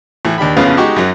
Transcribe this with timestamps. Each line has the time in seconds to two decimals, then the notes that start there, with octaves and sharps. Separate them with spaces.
0.25 A2 E3
0.38 D#2 D4 G4 B5
0.57 A1 F2 C#3 B3 C#4 F5
0.77 G#3 D#4 F#4 G4 C#6
0.96 F#2 F#3